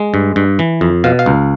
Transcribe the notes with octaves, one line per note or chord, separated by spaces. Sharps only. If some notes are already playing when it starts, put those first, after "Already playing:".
Already playing: G#3
G2
G2
E3
F2
B2 F5
F5
C#2